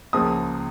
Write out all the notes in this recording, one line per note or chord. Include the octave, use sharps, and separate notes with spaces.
C#2 C#3 F3 A#3 D#6